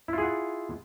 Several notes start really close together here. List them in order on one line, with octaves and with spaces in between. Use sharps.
E4 F4 G#4 F#5